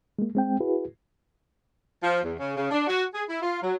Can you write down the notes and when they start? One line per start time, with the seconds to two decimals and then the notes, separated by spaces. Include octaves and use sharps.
0.19 G#3 A#3
0.35 G#3 C4 G5
0.60 E4 F#4 G#4 B4
2.02 F3
2.23 E2
2.39 C#3
2.57 C#3
2.71 D4
2.87 F#4
3.14 G#4
3.29 E4
3.42 F4
3.62 F#3